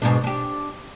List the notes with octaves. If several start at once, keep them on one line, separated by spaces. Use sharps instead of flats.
G#2 B2 D4
D4 G4